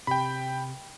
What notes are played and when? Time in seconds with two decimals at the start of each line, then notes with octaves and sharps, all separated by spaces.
0.07 C3 G5 B5